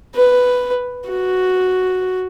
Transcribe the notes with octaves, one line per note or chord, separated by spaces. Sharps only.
B4
F#4